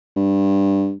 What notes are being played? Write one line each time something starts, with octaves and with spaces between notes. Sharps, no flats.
G2